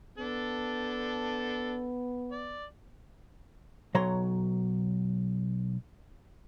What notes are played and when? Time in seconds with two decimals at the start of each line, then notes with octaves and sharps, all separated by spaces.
0.18 B3 D4 A4
2.31 D5
3.95 B1 F#3 C#5 A#5 C6